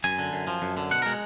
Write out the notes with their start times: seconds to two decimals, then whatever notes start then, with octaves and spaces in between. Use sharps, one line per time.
0.04 F#2 G#5
0.19 D3
0.33 F#2
0.47 F3
0.62 F#2
0.77 D3
0.91 B2 F#5
1.02 G#3 A#4